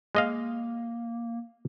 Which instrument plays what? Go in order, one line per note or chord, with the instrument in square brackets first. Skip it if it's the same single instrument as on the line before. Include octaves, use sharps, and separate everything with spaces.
[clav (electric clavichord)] G#3 D#5 F5 [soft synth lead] A#3